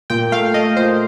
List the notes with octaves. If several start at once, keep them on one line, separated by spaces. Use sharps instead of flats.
A#2 G5
A3 F5
A3 D#5
A#2 C5